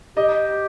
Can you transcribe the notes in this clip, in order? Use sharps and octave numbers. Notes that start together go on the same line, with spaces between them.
G4 D#5